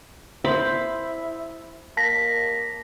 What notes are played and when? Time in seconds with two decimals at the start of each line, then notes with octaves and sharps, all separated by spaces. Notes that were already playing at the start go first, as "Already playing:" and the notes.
0.44 E4 C5 B5
1.97 A#3 A5 A#6 B6